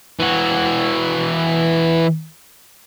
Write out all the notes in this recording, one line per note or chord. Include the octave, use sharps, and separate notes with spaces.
E3 F#4